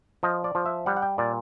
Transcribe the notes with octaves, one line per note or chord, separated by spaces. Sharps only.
F3 D#5
D5
F3
E5
G3 F#5
F#5
G5
A#2 D5